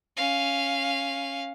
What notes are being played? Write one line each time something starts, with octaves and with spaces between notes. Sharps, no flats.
C#4 F5